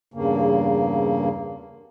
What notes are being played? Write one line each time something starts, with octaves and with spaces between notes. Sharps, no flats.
E2 G2 C#3 A#3